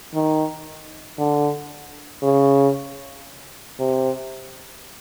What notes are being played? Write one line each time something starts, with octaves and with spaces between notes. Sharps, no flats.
D#3
D3
C#3
C3